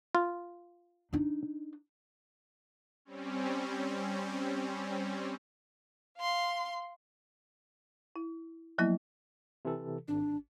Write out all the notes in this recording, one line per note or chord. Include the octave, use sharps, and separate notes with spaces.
F4
D4 D#4
G3 C4 C#4
F5 C6
E4
F3 F#3 A#3 B3 E4
C3 E3 A4
G#1 D4